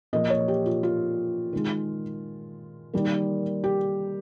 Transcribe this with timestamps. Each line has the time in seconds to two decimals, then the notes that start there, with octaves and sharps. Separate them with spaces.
0.13 A#2 F3 A#3 D#5
0.30 C#5
0.48 G4
0.66 F4
0.83 F4
1.53 D#3 G#3
2.93 D#3 G3 A#3
3.64 G4